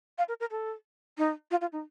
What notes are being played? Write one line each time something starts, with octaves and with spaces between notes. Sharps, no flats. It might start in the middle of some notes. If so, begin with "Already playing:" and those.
F5
A#4
A#4
A4
D#4
F4
F4
D#4